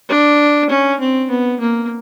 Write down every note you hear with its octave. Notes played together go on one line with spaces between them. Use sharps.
D4
C#4
C4
B3
A#3